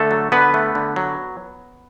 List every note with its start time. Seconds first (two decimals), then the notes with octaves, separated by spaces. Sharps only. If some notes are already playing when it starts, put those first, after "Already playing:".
Already playing: D3 A3 A4
0.11 F#3
0.32 D3 B3 B4
0.54 A3
0.75 D3
0.96 F#3